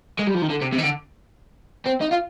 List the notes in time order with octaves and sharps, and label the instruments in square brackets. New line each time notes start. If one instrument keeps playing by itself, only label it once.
[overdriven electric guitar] G#3
G3
F3
D#3
D3
C3
C3
D#3
D3
C4
D#4
F4